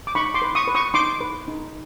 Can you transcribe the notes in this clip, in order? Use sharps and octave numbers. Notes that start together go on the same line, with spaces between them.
D6
D#4 B5 C#6
C6 D6
B4
C#6 D#6
B4
C#6 D#6
D#4 C6 D6
B4
D#4